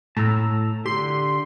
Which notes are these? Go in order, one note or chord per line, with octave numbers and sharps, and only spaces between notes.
A2 A5 A#5 E6
D3 G4 C6